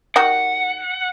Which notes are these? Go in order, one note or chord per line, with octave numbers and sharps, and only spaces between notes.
D#3 F#4 G4 F#5